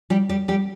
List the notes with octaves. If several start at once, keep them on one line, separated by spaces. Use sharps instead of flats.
G3 G4
G3 G4
G3 G4